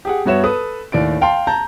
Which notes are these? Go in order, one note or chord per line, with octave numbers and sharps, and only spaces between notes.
G4 G#4 F#5
G2 B3 F#4 C#5 E5 E7
A4 B4 D#6
D#2 A2 D5 D7
F5 G5 A5 C6
A5 A#5 G6